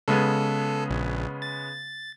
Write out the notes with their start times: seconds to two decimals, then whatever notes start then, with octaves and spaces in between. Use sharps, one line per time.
0.08 C#3 G#3 B3 A4
0.90 A#1
1.42 A6